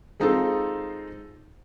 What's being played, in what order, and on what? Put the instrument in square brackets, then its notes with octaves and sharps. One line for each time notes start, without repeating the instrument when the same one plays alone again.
[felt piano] G#3 C4 D#4 F4 G#4 A4